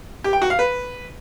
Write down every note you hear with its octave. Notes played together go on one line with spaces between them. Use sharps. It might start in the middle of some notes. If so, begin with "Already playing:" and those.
G4
G5
F#4
F5
B4